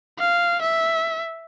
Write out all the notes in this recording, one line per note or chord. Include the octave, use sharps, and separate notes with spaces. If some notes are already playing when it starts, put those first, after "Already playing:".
F5
E5